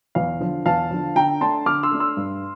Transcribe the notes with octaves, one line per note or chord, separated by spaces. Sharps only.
E2 F5
D3 F3
E2 F5 A5
D3 F3
D3 G5 A#5
A3 D4 A5 C6
D3 D6 F6
C6 E6
A3 D4
C6 E6
G2